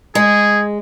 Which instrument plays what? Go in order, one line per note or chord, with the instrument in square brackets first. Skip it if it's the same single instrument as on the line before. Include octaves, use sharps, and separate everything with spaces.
[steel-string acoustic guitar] G#3 [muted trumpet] G#4